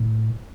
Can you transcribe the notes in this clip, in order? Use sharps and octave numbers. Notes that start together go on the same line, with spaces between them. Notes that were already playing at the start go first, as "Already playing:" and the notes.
Already playing: A2